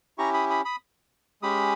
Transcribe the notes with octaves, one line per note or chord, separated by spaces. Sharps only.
C#4 E4 G4 A#5 C#6
B5 D#6
B5 D#6
B5 D#6
G#3 C#4 G4 B5 D#6